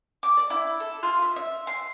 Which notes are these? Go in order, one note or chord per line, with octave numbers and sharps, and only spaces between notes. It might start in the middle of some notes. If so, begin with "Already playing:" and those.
D6
D5
E4
A4
F4
E5
E5
C6